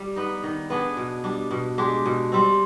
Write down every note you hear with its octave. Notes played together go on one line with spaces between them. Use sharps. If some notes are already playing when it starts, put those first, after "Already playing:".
Already playing: G3
B3 D#4
D#3
B3 D4 G#4
B2
G3 D4
B2
G#3 D4 G4
B2
G3 C4